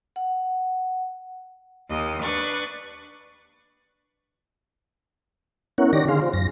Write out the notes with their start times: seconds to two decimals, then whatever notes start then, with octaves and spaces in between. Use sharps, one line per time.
0.16 F#5
1.88 D#2 D#5
2.21 D4 B4 C#6 A6
5.78 B3 C#4 E4 A#4 C#5 F#5
5.93 D#3 D#4 G4 C#5 D5 A#6
6.08 D3 G#4 F5 C6
6.22 F4 C5
6.33 F#2 A#6